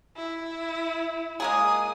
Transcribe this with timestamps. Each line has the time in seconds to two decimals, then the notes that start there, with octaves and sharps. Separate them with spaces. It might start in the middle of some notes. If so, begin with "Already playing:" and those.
0.16 E4
1.40 G#3 A#3 G#4 D#6